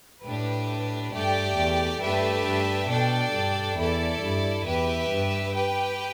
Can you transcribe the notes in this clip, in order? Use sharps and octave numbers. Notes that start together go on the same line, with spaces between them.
A2 D4 G4 B4
G2 A3 G4 D5 G5
E2
G2 A3 D4 G4 B4 E5
G2
B2 D4 A4 D5 G5
G2
E2 E4 A4 D5
G2
E2 G4 B4 E5
G2
G4 B4 G5